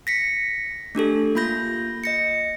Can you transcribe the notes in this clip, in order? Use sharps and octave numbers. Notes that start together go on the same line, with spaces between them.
A#6 B6 C#7
A3 D4 G4 A4
A#3 F4 B5 G6 A#6
D#5 A#6 C#7